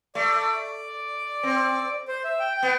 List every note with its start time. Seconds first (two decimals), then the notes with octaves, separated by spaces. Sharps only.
0.15 A3 D5
1.43 C4
2.08 C5
2.24 E5
2.40 G5
2.57 G5
2.63 B3